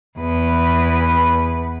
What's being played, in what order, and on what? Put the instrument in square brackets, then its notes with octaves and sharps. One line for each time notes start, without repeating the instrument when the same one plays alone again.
[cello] E2 B4